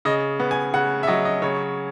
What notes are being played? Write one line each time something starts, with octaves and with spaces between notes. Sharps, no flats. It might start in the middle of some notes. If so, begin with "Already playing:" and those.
C#3 D#5
B3
G#5
C#3 F#5
E5
F#3 D#5
D#5
C#3 C#5